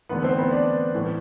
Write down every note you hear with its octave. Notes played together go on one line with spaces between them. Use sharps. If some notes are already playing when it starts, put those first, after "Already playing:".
E2 D3 A3 B3 B4
C4 C5
B3 B4
D4 D5
A2 E3 A3